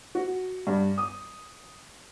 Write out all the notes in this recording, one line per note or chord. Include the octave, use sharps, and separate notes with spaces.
F#4
G2
D#6